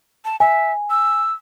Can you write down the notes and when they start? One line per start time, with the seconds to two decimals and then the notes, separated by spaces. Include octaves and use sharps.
0.25 A5
0.40 E5 G#5
0.90 E6